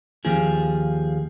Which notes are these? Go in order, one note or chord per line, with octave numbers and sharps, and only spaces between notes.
D#2 F3 G#4